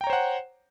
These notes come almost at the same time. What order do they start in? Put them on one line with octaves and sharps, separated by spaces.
G5 A#5 C#5 C5 F#5